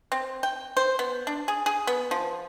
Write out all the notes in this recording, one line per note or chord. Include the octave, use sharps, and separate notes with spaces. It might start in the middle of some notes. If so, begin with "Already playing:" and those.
C4
G5
C5
B3
D4
G#4
G#4
B3
F3